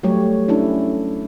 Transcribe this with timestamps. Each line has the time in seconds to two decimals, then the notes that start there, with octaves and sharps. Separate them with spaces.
0.03 F#3 G3 A3 G4 C#5
0.48 C#4 D4 E4 A4